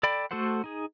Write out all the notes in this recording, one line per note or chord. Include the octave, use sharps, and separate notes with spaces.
A4 D5 G5 B5
A3 F#4 A4 C5 F#5
D#4 G#4